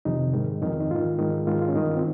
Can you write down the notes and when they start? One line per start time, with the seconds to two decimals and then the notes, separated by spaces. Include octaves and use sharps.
0.05 F2 C3 D#3 D#4
0.33 G#2 D#3
0.62 F2 D#3
0.80 D#4
0.91 G#2 D#3 F4
1.18 G#2 D#3
1.47 G#2 D#3 F4
1.61 F4
1.68 C#4
1.74 G2 D#3 D#4
1.89 F4
1.96 C4